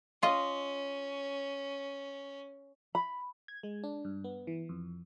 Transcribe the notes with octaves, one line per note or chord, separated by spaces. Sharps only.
C#4 F4 D#5
B5
G#6
G#3
D4
G2
B3
E3
F2